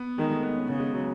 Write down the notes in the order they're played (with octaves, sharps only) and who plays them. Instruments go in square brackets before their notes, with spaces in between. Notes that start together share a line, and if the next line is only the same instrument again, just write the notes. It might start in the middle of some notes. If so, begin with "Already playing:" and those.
Already playing: [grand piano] B3
[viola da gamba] D#3 [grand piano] G#3
[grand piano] A3
B3
C#4
[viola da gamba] C#3 [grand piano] B3
[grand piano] G#3
F#3